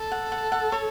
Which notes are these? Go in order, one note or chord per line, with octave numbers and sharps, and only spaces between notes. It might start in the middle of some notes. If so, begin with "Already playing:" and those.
Already playing: A4
F#5
F#5
F#5
C#5